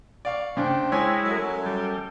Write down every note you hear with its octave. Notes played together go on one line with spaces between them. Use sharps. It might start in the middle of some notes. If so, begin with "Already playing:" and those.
D5 F5 C#6
C#3 D4 C5 G5
G#3 E4 C#5 G#5 C6
F#2 F#3 A4
G3